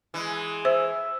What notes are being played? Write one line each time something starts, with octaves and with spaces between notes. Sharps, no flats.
E3 G#3
C5 E5